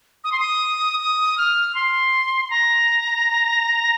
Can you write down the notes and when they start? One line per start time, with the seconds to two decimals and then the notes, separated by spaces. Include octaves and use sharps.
0.24 D#6
0.32 C6
0.39 D#6
1.00 D#6
1.38 F6
1.75 C6
2.45 C6
2.50 A#5